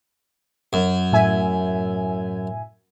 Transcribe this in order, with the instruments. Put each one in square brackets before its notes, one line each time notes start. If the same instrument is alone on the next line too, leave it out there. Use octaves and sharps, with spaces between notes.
[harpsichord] F#2
[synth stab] A2 E5 G#5